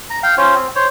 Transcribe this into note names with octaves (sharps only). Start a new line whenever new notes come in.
A#5
F5 G5
C#4 F4 C5 C#5
C4
C5 C#5